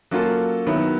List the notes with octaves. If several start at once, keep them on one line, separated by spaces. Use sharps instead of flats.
F#3 A#3 C#4 F4 A4
D#3 F#3 B3 E4